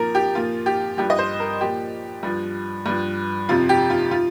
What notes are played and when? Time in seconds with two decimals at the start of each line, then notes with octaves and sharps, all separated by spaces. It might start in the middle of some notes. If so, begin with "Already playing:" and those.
Already playing: A#2 F3 A#4
0.15 G4
0.35 A#2 F3 F4
0.66 G4
0.97 G2 F3 G4
1.10 D#5
1.19 C5
1.40 A#4
1.61 A#2 F3 G4
2.23 G2 F3
2.86 G2 F3
3.49 F2 C3 F3 F4
3.69 G4
3.90 F4
4.11 F3 F4